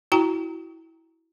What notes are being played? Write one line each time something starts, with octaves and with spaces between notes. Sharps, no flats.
E4 F#4 G5 A#5